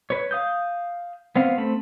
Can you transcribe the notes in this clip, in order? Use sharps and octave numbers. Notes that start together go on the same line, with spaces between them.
B4 C#5
F5 D#6 G6
B3 C4 F5
A3 C4 B5